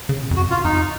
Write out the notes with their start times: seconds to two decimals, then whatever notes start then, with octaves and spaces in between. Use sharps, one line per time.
0.09 C#3
0.22 A#2
0.31 F2
0.36 F#2 F#4
0.50 F4
0.65 F2 D#4